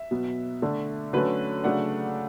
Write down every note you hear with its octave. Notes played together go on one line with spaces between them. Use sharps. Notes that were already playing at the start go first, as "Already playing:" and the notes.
Already playing: E5
B2 F#3 B3
D3 A3 D4
D3 F#3 A3 C#4 B4
C#3 F#3 A3 D4 F#5